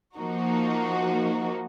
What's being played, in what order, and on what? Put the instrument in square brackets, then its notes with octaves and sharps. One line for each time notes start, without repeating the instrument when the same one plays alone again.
[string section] F3 A#3 D#4 F#4